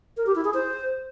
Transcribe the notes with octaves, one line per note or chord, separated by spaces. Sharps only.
A#4
G4
E4
G#4
C5